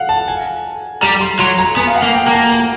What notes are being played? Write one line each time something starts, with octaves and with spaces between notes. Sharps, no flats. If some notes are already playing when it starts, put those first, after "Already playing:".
Already playing: F5 F#5
A5
G#5
G3 A#5
C6
F#3 C6
A#5
B3 G#5
F5
F#5
A#3
G5
A#3
A5
A#5